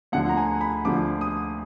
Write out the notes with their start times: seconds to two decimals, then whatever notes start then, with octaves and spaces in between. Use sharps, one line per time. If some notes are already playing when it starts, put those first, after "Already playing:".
0.12 D2 D3 F3 F#5
0.29 A#5
0.37 G#5
0.61 B5
0.85 D2 D3 F3 D6
1.21 D#6